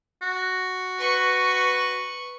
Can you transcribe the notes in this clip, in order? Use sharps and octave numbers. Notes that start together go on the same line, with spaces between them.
F#4
B4 C#6